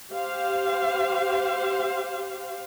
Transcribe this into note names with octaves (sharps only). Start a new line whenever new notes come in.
G4 C5 F5